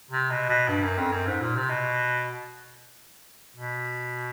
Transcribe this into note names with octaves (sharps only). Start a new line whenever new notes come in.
C3
B2
B2
G2
F#2
F2
F#2
G#2
A#2
C3
B2
B2